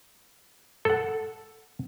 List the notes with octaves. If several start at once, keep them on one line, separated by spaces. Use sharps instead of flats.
A4 F#5